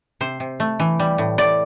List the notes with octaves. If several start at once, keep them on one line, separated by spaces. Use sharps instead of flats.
C3 C5
C3
A3
E3
G3
A2
A2 D5